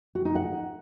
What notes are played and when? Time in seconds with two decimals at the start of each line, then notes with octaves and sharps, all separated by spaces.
0.15 F#4
0.25 D#4
0.35 F#5